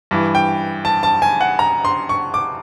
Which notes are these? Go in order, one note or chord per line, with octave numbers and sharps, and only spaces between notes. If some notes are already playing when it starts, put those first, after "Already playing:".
G2 E3
G5
A5
A5
G#5
F#5
A#5
C6
C#6
D6